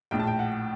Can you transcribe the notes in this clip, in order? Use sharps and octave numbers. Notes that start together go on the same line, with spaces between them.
A#1 A2 G5
A5
G5
F#5